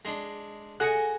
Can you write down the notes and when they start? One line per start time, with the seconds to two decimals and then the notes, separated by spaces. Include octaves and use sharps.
0.05 G#3 D4
0.80 F#4 G#4 A4 D#5 C#6